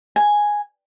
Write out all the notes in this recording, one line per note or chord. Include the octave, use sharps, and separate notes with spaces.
G#5